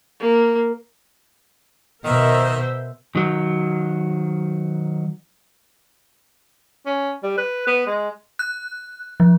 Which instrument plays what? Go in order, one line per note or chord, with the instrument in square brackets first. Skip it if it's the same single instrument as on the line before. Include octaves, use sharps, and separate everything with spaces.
[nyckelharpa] A#3
[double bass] B2 [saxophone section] D#3 [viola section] A#4 C5 E5
[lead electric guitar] D#3 F#3
[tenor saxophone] C#4
G3
B4
B3
G#3
[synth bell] F#6
F3